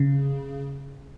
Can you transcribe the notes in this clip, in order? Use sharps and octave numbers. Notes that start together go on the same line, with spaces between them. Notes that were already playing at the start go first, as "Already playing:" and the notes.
Already playing: C#3